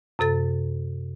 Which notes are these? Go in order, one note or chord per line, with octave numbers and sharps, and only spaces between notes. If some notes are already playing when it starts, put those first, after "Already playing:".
F#2 C3 A4 A6